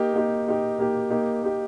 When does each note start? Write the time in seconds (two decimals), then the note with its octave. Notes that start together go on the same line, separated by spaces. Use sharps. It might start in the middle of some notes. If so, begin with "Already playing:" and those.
Already playing: A#3 D#4 G4
0.13 A#3 D#4 G4
0.46 A#3 D#4 G4
0.79 A#3 D#4 G4
1.10 A#3 D#4 G4
1.43 A#3 D#4 G4